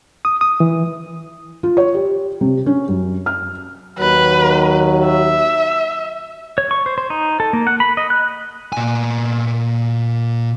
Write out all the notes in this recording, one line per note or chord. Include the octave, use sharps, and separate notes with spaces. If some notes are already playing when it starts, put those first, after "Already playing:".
D#6
D#6
E3
F4
C#5
G4
C3
C#4
F#2
F6
D#2 D#3 F#3 B4
E5
C#5
C#6
C5
C5
D#4
A4
A#3
F#5
B5
D#5
F#6
A#2 G#5